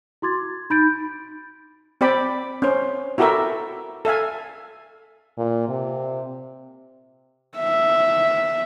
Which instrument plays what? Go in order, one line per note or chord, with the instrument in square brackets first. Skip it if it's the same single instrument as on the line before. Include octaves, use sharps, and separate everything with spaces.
[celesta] E4 F#4 C6 D6 G#6 A6
D#4 B5 G6 A6 D7
[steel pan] C4 G4 D5 G5 B5
C#4 C5
E4 F#4 G4 A4 A#4 E5
A4 E5 F5 G#5
[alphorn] A#2
C3
[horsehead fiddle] E5